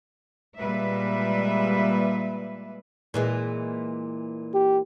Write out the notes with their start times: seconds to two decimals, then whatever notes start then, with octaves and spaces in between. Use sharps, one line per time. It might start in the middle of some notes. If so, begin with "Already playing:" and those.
0.58 A#2 G3 G#3 B4 E5
3.14 A#2 E3 G#3
4.54 G4